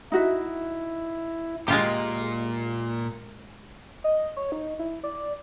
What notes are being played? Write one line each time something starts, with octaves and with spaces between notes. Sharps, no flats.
D#4 E4 F#4 E5
A#2 G#3 F4 G4
D#5
C#5
D#4
E4
D5